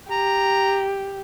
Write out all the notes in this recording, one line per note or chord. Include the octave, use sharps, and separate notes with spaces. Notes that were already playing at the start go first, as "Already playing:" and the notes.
G4 A#5